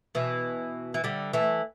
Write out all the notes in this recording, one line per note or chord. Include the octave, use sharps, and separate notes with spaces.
B2 E3
E3
D3 G3
E3 A3